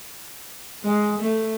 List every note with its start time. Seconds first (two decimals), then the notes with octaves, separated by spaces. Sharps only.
0.83 G#3
1.19 A3